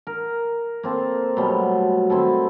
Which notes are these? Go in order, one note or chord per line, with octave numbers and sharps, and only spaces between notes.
A#4
A#3 C4 A4
B2 F#3 G3 A3
D#3 C4 E4 A4